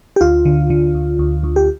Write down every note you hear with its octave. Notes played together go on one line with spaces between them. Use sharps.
G4
D2 F4
D3
D3
D2
D2
D2
G4